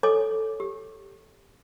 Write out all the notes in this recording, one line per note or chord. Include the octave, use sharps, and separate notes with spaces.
A4 C#5 D#5 G#5 D6
G4